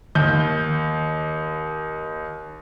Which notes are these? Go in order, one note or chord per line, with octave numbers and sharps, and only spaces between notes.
D#2 G6